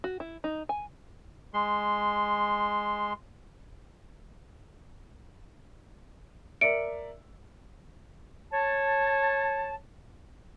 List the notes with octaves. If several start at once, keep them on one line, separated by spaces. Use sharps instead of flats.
F#4
E4
D#4
G#5
G#3 C6
A#4 D5 E5 C#7 D7
C#5 A5